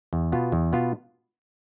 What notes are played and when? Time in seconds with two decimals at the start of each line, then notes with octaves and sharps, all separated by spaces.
0.13 E2
0.32 B2 B3 F4
0.52 E2
0.72 B2 B3 F4